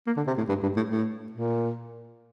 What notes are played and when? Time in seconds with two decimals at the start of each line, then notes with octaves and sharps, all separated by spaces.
0.06 A#3
0.17 D3
0.27 C3
0.38 A2
0.49 G2
0.62 G2
0.76 A2
0.90 A2
1.32 A#2